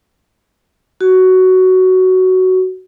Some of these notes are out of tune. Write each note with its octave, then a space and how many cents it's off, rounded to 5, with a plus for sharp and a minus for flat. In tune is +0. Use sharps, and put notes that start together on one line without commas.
F#4 +10